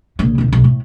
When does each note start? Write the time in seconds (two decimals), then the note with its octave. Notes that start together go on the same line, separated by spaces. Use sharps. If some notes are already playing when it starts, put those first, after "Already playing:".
0.19 A#1 C#3
0.38 D1 B1
0.53 B1
0.64 A2